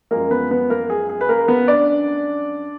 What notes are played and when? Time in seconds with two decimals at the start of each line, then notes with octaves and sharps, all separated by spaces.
0.11 F#2 F3 G#3 A#3 A#4
0.30 B3 B4
0.51 B3 B4
0.70 A#3 A#4
0.90 G#4
1.10 G#4
1.21 B4
1.29 A#3 A#4
1.48 B3 B4
1.68 D4 D5